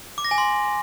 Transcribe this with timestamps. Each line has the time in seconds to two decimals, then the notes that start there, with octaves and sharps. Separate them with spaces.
0.18 D6
0.25 A#6
0.31 G#5
0.38 C6